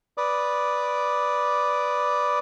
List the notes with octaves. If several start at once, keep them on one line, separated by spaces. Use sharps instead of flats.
B4 D5 D6 D#6